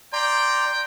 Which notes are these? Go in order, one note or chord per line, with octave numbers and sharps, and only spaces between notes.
D5 G5 A#5 C6